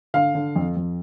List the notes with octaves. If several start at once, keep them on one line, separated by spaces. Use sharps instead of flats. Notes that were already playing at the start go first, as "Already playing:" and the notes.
D3 F5
D3
F2
F2